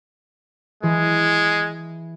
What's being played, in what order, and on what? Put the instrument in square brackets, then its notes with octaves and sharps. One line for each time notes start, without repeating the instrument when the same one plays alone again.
[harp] E3 G#4 [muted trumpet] G#3